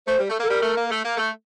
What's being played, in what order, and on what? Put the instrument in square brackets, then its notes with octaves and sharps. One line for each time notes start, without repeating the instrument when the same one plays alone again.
[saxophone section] A3 [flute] C5
[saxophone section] G3
A3
A#3
[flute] A4
[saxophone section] G3 [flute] A#4
[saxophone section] A3
A#3
A3
A#3
A3